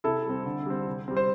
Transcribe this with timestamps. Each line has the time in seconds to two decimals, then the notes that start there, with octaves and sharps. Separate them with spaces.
0.04 C3 E4 A4
0.25 G3 C4
0.46 D3
0.66 G3 C4
0.87 C3
1.08 G3 C4
1.17 C5